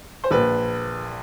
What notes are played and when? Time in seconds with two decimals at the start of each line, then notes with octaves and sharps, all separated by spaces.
0.24 C5
0.31 A#1 A#2 B4